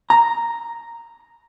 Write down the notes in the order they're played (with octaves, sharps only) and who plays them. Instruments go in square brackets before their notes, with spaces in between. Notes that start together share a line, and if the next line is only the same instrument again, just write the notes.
[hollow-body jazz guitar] A#5